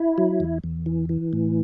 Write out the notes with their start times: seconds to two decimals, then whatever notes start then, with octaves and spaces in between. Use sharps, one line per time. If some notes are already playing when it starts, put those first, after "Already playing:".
Already playing: E4
0.18 F#3
0.40 E2
0.64 E2
0.86 E3
1.09 E3
1.33 A2